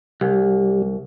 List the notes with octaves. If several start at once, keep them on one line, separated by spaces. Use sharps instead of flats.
C2 G3